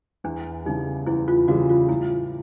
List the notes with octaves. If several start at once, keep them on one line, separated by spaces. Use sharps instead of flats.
E2 D4
C#3 E3 G3 D#4
E2 E4
F4
C#3 E3 G3 F#4
F4
A2 E4